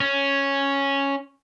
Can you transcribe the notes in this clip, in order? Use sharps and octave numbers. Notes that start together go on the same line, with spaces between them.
C#4